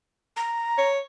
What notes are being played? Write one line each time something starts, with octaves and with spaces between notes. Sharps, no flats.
A#5
C#5